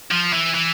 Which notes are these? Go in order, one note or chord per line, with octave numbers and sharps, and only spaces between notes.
F3
E3
E3